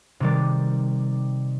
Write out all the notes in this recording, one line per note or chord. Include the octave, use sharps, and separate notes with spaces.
C3 D#3 G3 D5